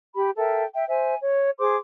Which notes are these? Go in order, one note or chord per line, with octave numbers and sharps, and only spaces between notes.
G4 B5
A4 A#4 E5 G5
E5 G5
C5 E5 G#5
C#5
G#4 C5 C6 D6